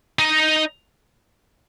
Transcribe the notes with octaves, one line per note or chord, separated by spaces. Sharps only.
D#4